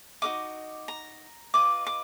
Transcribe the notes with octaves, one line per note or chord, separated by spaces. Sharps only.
D#4 F#4 A#4 D#5 D6
A#5
F4 B4 D#5 D6
D6